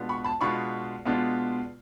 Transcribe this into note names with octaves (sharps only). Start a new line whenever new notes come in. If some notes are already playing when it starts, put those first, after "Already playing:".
Already playing: B2 G#3 B3 D4 F4
B5 C#6
A5 B5
B2 G#3 B3 D4 F4 B5 C#6
B2 G#3 B3 D4 F4